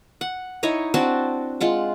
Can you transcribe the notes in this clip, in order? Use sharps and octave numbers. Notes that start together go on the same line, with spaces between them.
F#5
D#4 E4 C#5 D#5
C4 D4 F#4 A5
G#3 F4 F#5